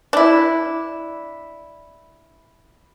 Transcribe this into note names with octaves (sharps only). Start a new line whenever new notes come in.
D4 E4